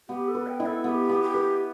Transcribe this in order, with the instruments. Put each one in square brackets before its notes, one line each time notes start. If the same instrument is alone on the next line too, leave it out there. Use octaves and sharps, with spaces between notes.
[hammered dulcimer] B3 [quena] G4
[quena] A4
[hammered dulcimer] B4
[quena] G5
[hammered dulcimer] E4
[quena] A4
[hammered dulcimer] B3 [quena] A4
[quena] G4
[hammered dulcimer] B3
[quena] G4
[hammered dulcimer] B4